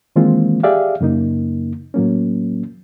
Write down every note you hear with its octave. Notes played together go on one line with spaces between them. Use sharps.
D#3 E3 G#3 A#3 C4 F4
G4 G#4 D5 E5 F5
F#2 C#3 A#3 D#4
A2 F#3 A#3 C#4